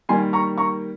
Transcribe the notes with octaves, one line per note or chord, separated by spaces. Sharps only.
D#3 G3 A#3 G#5 C6
A#5 C#6
A#5 C#6